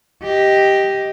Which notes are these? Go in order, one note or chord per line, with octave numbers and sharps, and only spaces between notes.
G4 D#5